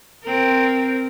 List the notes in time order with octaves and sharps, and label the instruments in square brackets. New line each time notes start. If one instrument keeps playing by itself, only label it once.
[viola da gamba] C4 A#4